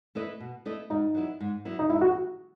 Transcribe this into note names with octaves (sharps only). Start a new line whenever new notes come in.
A3 E4 B4 D#5
B2
A3 E4 B4 D#5
G#2 D#4
F#3 B3 E4
G#2
F#3 B3 E4
D#4
G#2 E4
F#4